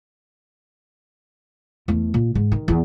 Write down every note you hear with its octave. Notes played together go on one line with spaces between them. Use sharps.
E2 A3
A#2
G#2
D#3
E2 B3